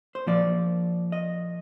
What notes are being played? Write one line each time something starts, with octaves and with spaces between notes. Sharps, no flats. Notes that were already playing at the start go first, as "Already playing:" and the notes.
C5
A#2 F3 D5
D#5